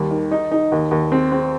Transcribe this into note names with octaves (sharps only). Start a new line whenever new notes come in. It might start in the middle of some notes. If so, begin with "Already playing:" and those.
Already playing: D#2 G3
D#3
D#4
D#4
D#2
D#2
C4
C4